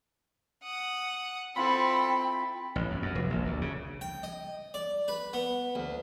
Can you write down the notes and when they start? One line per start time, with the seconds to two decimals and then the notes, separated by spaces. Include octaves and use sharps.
0.63 F#5 D#6
1.56 C4 E4 F4 A4 G5 B5 C6
2.76 A1
2.90 F#2
3.02 F#2
3.15 F1
3.30 A#1
3.45 D2
3.62 C#3
4.01 G5
4.23 D#5
4.74 D5
5.08 B4
5.33 B3
5.75 D2